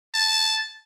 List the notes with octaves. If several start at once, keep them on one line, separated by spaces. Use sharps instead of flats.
A5